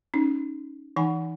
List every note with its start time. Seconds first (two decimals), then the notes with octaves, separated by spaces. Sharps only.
0.14 C#4 D#4
0.96 E3 D#4 F#5 G#5 B5